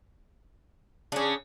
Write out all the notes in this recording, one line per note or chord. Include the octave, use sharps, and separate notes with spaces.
C#3 C#4 D4 G#4